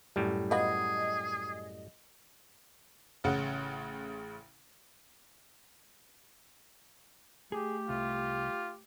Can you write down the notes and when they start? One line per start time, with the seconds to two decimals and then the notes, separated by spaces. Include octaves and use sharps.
0.16 F#2 A2 G3
0.51 B3 F4 F#4 G#4 D#5
3.24 A1 C#3 F#5
7.52 A3 G4 G#4
7.89 C2 F4